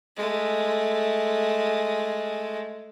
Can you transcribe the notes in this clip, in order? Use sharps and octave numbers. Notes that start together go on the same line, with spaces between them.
G#3 A3